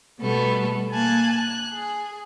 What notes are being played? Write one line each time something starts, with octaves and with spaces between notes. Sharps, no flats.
B2 G3 A3 B3 A4
A#3 G#5 A5 F#6 G#6
F#6
G#4